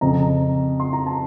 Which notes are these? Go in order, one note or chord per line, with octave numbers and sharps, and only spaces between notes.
F2 C#3 A#5
C6
A#5
A5